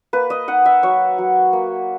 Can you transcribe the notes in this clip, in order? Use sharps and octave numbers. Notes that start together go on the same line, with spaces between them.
A#3 B4
D#5
D#4 F#5
E5
F#3 C#5
F#3
A#3